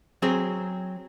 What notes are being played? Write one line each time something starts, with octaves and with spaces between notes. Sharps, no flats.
F#3 C4 G#4